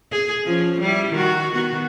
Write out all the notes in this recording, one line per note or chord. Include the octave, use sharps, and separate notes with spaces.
G#4
F3 C#4
G3 E4
D#3 F#4
D#3 B3 F#4